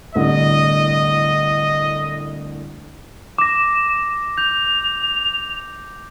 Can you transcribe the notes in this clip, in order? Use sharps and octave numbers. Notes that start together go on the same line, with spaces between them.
C2 A2 D3 D#5
D6 A#6 E7
G6 F7